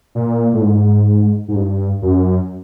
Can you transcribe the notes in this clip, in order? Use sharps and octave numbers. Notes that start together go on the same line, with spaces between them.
A#2
A2
G#2
G#2
G2
F#2